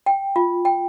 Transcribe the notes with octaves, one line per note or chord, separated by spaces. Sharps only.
G5
F4
G5